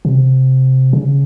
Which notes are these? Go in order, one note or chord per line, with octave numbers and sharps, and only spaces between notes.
C3
C#3